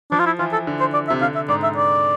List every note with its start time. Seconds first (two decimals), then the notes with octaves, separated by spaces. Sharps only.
0.11 F3 D4
0.20 F4
0.26 E4
0.39 E3 F4
0.53 A4
0.67 D3
0.80 C5
0.94 D5
1.08 C3 E5
1.21 D3 F5
1.35 E5
1.48 G#2 D5
1.63 E5
1.77 D5